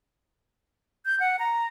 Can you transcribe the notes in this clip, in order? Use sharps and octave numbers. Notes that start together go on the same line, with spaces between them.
G6
F#5
A#5